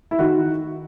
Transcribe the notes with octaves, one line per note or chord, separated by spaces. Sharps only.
E4
D#3 F#4